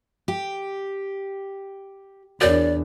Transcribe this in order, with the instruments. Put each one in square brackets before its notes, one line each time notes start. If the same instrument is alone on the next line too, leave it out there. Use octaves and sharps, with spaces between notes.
[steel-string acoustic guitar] G4
[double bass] E2 D4 [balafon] F#4 A#4 C#5 [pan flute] D5